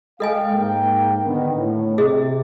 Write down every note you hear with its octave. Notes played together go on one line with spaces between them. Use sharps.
G#3 A4 D#5 F5 G5 G#5
G#2 A#3 G5
D3 D#3 B3
A2
C3 G#4 D#5